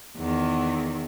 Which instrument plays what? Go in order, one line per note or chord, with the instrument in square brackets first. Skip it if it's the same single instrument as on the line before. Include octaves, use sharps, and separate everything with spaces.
[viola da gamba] E2 D#3